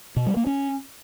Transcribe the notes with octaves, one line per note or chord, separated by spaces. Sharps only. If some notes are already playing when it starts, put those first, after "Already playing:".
B2
G3
A#3
C#4